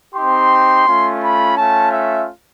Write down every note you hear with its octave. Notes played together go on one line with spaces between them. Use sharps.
C4 D#4 G4 C6
A3 C#4 F4
B5
A3 C#4 F4 A5
E5